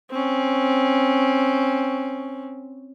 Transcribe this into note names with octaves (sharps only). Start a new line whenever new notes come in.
C4 C#4